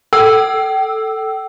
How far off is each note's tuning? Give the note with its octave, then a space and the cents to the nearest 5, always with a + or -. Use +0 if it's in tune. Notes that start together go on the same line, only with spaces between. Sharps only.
A4 +0 G5 -35 E6 +0